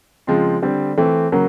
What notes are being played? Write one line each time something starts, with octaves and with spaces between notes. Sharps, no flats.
C#3 F3 G#3 C4 F4
D3 G3 C4
E3 A3 C4
C#3 F#3 A#3